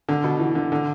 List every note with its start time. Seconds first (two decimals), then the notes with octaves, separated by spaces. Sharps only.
0.08 D3
0.24 B2
0.39 E3
0.55 D3
0.72 D3